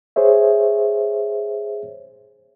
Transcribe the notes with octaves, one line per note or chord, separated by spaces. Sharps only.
G#4 C5 C#5 E5